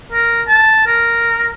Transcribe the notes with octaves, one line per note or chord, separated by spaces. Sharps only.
A#4
A5
A#4